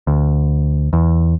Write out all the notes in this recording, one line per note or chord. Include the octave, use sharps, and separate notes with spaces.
D2
E2